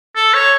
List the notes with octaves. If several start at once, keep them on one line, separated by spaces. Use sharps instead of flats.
A4
C#5